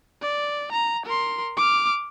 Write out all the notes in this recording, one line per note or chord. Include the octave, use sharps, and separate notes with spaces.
D5
A#5
A#4 C6
D6 F6